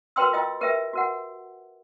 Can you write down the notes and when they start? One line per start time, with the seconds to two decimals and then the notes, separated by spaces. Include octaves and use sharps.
0.16 F#4 A#4 B4 G5 C6 E6
0.33 F4 D#5 G5 E6
0.61 G4 A#4 B4 E5 G5
0.93 F#4 A#4 F#5